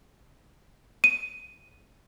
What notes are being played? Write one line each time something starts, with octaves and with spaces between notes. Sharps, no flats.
D#7